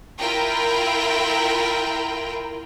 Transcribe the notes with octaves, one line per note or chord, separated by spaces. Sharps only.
E4 F4 A#4 G5